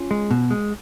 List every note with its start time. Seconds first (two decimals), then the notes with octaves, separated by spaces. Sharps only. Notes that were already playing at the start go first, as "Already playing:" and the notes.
Already playing: C#4 F4
0.11 G#3
0.31 B2
0.51 G#3